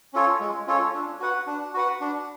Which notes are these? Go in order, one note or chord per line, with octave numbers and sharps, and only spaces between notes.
C#4 F4 A4 C#5
G#3
C#4 F4 A4 C#5
D4
F#4 B4 F#5
D4
F#4 B4 F#5
D4